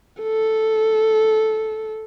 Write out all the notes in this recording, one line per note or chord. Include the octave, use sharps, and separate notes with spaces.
A4